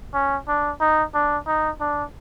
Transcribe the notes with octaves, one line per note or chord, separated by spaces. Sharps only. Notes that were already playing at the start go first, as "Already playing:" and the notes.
C#4
D4
D#4
D4
D#4
D4